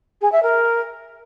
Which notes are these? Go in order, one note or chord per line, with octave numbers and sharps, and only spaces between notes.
G#4
E5
A#4